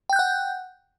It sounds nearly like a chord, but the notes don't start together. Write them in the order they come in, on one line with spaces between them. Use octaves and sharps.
G5 G6 F#6 F#5